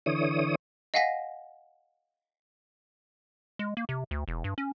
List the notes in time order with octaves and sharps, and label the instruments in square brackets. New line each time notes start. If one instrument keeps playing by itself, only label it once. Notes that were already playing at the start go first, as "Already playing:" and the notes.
[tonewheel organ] D3 E3 C#5 D#6
[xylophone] D#5 F5 F#5 G#5 A#6 B6
[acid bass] G#3
A#3
C3
D2
E1
G2
C#4